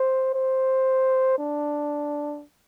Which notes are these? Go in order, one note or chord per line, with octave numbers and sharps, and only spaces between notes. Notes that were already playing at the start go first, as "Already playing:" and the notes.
Already playing: C5
C5
D4